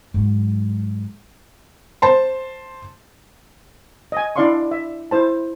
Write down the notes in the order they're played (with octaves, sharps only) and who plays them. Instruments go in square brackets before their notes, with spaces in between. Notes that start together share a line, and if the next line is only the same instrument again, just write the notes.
[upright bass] G#2 F#3
[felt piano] C5 A5 C6
[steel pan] D#5 G#5
D4 E4 D5 F5 C6 C#6
E5
E4 C5 A5